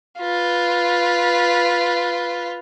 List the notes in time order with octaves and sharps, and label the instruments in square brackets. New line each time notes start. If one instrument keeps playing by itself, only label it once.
[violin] F4 B4